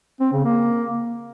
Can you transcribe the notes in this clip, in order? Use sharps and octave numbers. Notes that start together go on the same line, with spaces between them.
C4
C#3
A#3